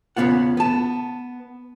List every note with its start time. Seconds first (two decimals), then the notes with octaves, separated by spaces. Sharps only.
0.16 E2 C#3 A3 B3 F4 F#5
0.57 B3 A5